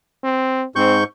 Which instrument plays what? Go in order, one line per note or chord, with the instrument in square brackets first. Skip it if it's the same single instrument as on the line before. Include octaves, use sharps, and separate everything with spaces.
[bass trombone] C4
[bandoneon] G#2 C#6 G6 [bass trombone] C4